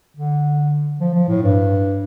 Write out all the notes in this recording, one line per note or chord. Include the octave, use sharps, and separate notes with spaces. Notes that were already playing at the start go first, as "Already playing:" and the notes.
D3
F3
F3
A2
G2